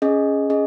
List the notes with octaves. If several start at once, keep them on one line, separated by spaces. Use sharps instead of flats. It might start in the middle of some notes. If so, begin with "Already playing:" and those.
C#4 G#4 D#5
C#4 G#4 D#5